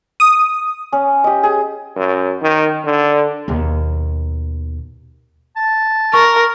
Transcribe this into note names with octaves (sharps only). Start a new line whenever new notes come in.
D#6
C#4
G4 D#5
G#4
F#2
D#3
D3
D#2 B2
A5
A#4 C#6